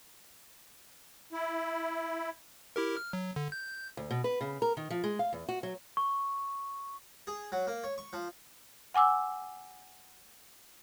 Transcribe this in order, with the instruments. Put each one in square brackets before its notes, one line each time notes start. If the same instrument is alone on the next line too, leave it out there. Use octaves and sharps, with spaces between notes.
[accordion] E4
[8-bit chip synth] E4 G4 A#4
F6
F#3
D3
G6
[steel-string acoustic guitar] D2
B2
B4
C#3
A#4
D#3
F3
G#3
F5
E2
F#4
F#3
[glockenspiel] C#6
[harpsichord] G#4
F#3
A#3
C#5
C#6
F3
[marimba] F#5 G#5 D6 E6